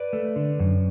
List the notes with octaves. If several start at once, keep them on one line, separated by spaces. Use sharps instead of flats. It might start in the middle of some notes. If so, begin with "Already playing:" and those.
Already playing: B4 D5
A3
D3
F#2